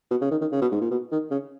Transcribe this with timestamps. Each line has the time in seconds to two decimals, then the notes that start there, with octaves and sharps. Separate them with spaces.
0.11 B2
0.21 C#3
0.31 D#3
0.41 D#3
0.52 C#3
0.62 B2
0.72 G#2
0.81 A#2
0.91 B2
1.12 D#3
1.31 C#3